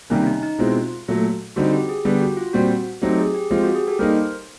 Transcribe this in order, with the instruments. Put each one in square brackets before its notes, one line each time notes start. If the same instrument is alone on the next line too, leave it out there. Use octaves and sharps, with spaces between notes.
[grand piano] C3 D#3 G3 A#3 [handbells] C#4
[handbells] D#4
D#4
[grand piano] B2 G#3 C4 E4 [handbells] F4
[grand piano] A#2 F#3 A3
[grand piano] D3 G3 C4 D#4 [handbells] F#4
[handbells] G4
G#4
[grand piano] D3 G3 B3 [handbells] G4
[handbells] F#4
F4
[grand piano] A#2 G3 C4 [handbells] F#4
[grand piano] F#3 A3 C4 D#4 [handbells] G4
[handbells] G#4
G4
[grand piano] F3 G#3 C4 F4 [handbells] G4
[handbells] F#4
G#4
G4 A4
[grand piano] G3 A#3 D#4 [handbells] A#4 C5